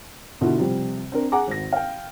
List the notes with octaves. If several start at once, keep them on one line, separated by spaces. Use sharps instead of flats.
B2 D3 E4 F4
C3 F3 G3
C4 D4 A#4
G#4 F#5 G#5 A#5 D6
G#1 A#6
F5 G5